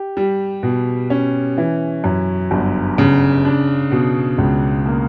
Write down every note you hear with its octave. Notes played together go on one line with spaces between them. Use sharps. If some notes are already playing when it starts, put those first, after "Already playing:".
Already playing: G4
G3
B2
C#4
E3
F#2
G1
C#3
D4
B2
C#2
A#3